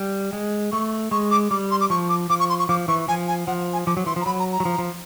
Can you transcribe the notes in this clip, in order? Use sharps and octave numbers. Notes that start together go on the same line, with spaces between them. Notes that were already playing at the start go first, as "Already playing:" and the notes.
Already playing: G3
G#3
A3 C#6
G#3 C#6
D6
G3 D6
C6
D6
F3 C#6
D6
F3 D6
C#6
C6
C#6
F3 D6
E3 C#6
F3 G#5
G#5
F3 F#5
G#5
F3 D6
F#3
E3 C6
F3
A#5
F#3 B5
A#5
A#5
F#3
F3
F3